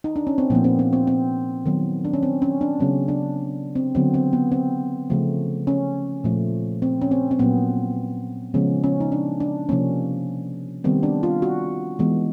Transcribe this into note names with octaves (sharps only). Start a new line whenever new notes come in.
D#4
D4
C#4
C4
A#2 F3 A#3 B3
C4
C4
C4
C4
D#3 F#3 B3
D4
C#4
C4
C#4
D4
C#3 F#3 B3 C#4
D4
C4
D3 F#3 B3 C4
C4
B3
C4
C#3 F3 A3
C#4
A#2 F3 A3
C4
C#4
C4
C4
A#2 F#3 A#3 B3
C#3 F3 G#3 B3 C#4
C#4
D#4
D4
D4
C3 F3 A#3 C#4
D#3 G3 B3 C4
D4
F4
F#4
E3 G#3 B3